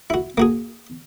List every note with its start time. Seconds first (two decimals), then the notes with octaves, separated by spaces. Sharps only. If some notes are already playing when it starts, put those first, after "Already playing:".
0.10 E4 F#4
0.38 A#3 F#4 G#4